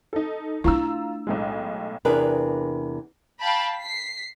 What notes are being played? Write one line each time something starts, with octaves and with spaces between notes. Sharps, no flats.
D#4 A4
A3 D4 E4 F4 A#5 E6
B1 A2 G#3
E2 C3 D4 G#4 A#4 B4
F5 G5 A5 B5
B6 C7